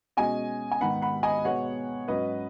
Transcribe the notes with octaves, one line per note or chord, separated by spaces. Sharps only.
B2 G#3 C#4 D#5 G#5
G#5
G#2 D#3 B3 F#5 B5
F#5 B5
D#5 G#5
B2 G#3 B3 C#5 F#5
G#2 F#3 C#4 B4 D#5